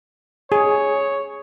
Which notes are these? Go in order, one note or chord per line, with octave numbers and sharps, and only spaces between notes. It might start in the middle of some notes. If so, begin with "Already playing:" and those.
G#4 C#5